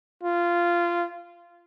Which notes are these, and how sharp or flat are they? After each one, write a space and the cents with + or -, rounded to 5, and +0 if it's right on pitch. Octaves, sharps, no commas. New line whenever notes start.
F4 -15